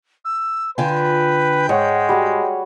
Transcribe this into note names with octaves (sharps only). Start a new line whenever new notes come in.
E6
D3 F4 B4 G5 G#5
G#2 G#3 C#5 F#5
G3 F#4 G#4